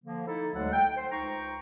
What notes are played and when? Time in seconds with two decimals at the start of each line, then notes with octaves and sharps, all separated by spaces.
0.04 D3 F3 A#3
0.26 D#4 E4 A4
0.54 D2 D3 F#3 G#3 A4 F#5
0.72 G5
0.96 C5
1.10 C#2 D#4 C5 G5 A#5 C#6